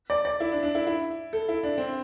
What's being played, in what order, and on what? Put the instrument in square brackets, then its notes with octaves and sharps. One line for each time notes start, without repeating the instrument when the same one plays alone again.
[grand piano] D5
D5
E4
D4
D4
E4
E4
A4
E4
D4
C4